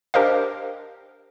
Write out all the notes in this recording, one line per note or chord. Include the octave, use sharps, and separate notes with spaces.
D4 G4 A#4 C5 D#5 F5